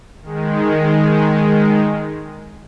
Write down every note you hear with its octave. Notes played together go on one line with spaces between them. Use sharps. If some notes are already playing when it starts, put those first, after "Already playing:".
D#3 G#3